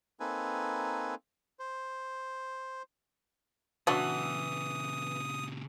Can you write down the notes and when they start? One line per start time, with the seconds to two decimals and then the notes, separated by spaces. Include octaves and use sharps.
0.20 A#3 C4 D#4 A4 B4 G#5
1.59 C5
3.87 A#2 C#3 E3 F#3 D4 F#4 D#6